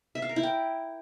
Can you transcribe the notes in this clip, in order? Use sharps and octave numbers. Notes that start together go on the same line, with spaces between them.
E5
F5
A#4
E4
G5